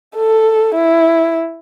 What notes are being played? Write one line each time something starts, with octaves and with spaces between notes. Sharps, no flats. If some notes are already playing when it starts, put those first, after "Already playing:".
A4
E4